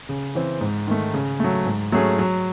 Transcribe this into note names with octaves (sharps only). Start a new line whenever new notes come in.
C#3
E3 C4
G#2
D#3 A3
C#3
F#3 A3
G#2
F#3 A3 C#4 G#4
F#3